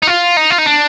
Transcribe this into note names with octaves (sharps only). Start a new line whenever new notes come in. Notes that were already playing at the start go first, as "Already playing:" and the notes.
D#4
F4
D#4
F4
D#4
D4